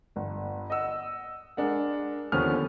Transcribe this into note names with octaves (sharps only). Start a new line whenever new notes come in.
G1
D#5 F#5 E6
G#3 D4 A#4 F#5
D#2 D3 F3 B3 C#4 F6